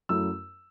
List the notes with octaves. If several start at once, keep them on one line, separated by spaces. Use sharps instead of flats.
F#2 F#3 A3 E4 E6